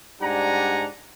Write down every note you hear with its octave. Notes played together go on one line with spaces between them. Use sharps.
G#2 G3 D4 F#5 G#5 A#5